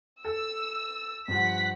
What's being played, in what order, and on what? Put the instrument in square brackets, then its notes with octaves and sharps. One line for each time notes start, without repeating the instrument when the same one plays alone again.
[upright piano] A4 [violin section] E6
[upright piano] G2 F3 [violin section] F#5 B6